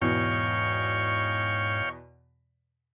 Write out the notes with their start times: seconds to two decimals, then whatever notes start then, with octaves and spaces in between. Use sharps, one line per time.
0.02 E2 G#2 B2 C#5 D#5 F5 G5 C#6